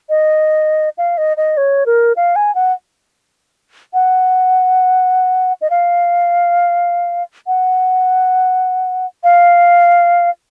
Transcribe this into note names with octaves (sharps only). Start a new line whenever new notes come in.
D#5
F5
D#5
D#5
C#5
A#4
F5
G#5
F#5
F#5
D#5
F5
F#5
F5